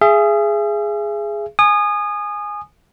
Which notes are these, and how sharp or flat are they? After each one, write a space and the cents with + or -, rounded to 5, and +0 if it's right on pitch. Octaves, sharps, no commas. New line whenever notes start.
G#4 +0 E5 +40
G#5 +0 D#6 -25